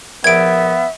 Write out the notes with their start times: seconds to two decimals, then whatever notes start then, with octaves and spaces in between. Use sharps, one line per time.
0.24 A#1 B3 E5 G#6 D7